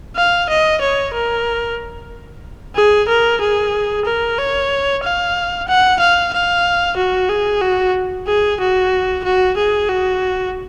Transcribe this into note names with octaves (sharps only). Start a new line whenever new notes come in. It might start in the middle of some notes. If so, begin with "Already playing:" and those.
F5
D#5
C#5
A#4
G#4
A#4
G#4
A#4
C#5
F5
F#5
F5
F5
F#4
G#4
F#4
G#4
F#4
F#4
G#4
F#4